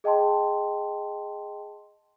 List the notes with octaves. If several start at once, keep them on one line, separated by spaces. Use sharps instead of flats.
G#4 D#5 G5 A5 C6